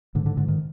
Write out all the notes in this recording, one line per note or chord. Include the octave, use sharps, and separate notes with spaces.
G#2 D3
D3
G#2 D3
D#3